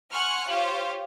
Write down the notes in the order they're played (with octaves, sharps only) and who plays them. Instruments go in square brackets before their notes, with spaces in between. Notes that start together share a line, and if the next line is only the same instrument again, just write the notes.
[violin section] F#5 G#5 C6 C#6 F6 F#6
F4 G4 C5 C#5 F5